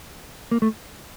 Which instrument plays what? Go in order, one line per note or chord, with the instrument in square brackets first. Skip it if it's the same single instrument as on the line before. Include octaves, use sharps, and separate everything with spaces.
[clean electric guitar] A#3
A3